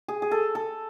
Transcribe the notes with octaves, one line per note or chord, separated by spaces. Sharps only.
G#4
G#4
A4
A4